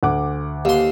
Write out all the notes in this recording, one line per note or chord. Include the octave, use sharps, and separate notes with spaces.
D2 F#5 D6
D#2 C6